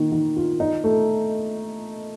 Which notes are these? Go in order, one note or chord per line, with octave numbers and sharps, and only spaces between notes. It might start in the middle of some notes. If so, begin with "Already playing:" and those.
Already playing: D#3 A#3
D#3
F4
D#4
A3